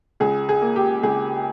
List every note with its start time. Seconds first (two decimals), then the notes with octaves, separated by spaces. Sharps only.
0.20 C#2 G#4
0.49 G#4
0.61 A#3
0.76 G4
1.03 C#2 G#4